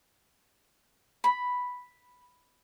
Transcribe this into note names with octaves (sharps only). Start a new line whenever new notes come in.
B5